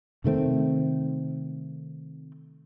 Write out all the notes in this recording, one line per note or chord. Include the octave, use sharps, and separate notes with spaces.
C3 D#3 A3 C4